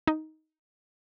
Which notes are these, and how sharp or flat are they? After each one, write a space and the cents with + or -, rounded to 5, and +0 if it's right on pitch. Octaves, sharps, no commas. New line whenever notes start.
D#4 +10